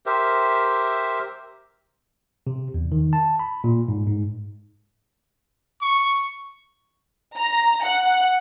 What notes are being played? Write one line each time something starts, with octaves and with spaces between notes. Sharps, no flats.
G4 A#4 C5 E5
C3
E2
D#3
A5
B5
A#2
G#2
G#2
C#6
A#5
F#5